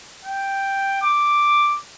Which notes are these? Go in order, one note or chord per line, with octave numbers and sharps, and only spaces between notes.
G5
D6